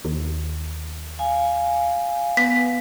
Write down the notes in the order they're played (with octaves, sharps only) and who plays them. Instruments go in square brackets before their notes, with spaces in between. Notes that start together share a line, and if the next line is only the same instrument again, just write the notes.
[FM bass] D#2
[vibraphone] F5 G#5
[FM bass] B3 [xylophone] B6